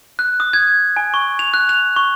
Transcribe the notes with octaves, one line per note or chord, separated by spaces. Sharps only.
F#6
D#6
G#6
G#5
C#6
F7
F#6
F7
C#6